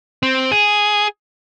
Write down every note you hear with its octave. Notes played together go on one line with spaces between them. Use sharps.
C4
G#4